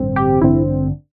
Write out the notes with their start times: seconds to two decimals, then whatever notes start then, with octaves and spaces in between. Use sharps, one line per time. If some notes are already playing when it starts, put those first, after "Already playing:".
Already playing: A1 G2 D3 C4
0.16 G4
0.41 A1 G2 D3 C4 E4